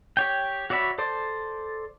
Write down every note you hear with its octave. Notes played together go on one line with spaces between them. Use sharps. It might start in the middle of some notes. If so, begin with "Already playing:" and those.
G4 C#5 G5
F#4 C#5 D5 E5 B5
A4 C5 D5